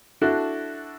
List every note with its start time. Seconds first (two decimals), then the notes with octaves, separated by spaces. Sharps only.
0.21 D4 E4 F#4 A4